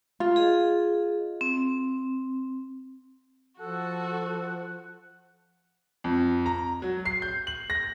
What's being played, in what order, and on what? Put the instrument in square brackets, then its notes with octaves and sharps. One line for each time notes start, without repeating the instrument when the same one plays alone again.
[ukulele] F4
[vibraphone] G#4 D#5
C4
[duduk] F3 [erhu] F#4 [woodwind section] A4 [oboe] F#5
[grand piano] F2
A#5
F#3
C7
G6
F#7
A#6